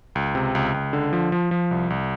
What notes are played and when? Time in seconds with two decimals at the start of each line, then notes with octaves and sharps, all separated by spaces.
0.15 C#2
0.35 C3
0.55 C#2
0.74 C#2
0.93 D3
1.13 F3
1.32 F3
1.51 F3
1.71 C2
1.90 C2